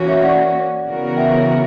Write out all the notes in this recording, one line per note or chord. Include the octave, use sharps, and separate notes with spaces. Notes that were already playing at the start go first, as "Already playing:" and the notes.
Already playing: E3 A#3 C#4 F#4
C#5 E5
D5 F#5
C#3 E3 B3 F#4 A#4
E5 G5